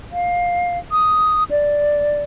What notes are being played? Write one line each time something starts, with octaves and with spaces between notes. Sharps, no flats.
F5
D#6
D5